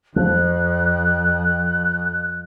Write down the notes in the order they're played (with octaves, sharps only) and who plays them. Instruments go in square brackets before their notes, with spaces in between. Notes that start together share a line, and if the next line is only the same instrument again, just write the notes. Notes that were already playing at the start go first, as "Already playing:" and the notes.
[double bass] F2 [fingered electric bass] F3 [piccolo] F#6